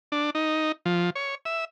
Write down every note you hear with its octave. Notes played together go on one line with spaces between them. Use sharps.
D4
D#4
F3
C#5
E5